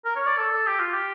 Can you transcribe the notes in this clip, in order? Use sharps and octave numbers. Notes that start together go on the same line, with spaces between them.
A#4
C#5
D5
A4
A4
G4
F4
G4